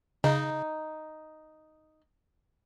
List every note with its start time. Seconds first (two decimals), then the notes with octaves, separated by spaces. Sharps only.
0.24 C#3 D#4